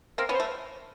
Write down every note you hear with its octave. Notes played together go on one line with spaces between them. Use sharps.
A#3 C4 A#4
B3 C#4
C5
A3